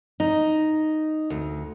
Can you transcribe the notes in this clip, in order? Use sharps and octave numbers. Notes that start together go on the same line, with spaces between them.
D#4
D2